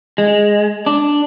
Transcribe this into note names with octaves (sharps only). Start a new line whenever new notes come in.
G#3
D4